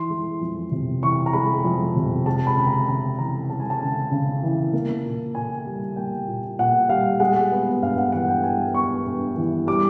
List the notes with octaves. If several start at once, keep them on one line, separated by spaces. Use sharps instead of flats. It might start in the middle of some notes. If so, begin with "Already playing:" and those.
Already playing: E3 C6
G#3
F2
C3
E3 C#6
A#5
G#3 B5
F2
C3
G#3 A5
B5
C#3
A#5
C#3 A#5
E3 A#5
G#3 A5
G#5
A5
C#3
C#3
E3
A#3
A#2
A#2 G#5
G3
A#3 G5
A#2
A#2 F#5
G3 F5
G#3 F#5
B3
G2 F5
F#5
E3 F#5
G5
G#3 G#5
B3 C#6
G2
E3
G3 D6